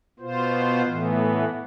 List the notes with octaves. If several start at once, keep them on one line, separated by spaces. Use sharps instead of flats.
B2 B3 F4 C5
A2 E3 B3